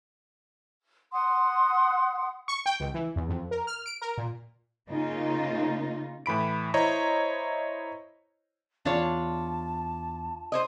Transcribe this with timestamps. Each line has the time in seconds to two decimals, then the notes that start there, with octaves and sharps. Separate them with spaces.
1.13 F#5 C6 D#6
2.48 C#6
2.66 G5
2.80 C#2
2.94 E3
3.16 E2
3.29 F2
3.51 A#4
3.67 F6
3.86 D7
4.02 A#4
4.18 A#2
4.89 C#3 A#3 D#4 F4
6.26 A2 E3 B5 D7
6.74 E4 C5 C#5 D#5 A#5
8.85 E2 D4 F4 C#5 A5 A6
10.52 C5 C#5 D#5